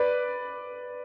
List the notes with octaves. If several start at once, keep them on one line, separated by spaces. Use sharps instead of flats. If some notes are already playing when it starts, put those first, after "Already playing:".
Already playing: B4 D5